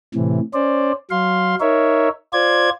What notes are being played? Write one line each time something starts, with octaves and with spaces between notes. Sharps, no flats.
A2 C3 E3
C#4 C5 D5
F#3 F5 C6
D#4 A#4 C#5 E5
F4 C5 D5 G#6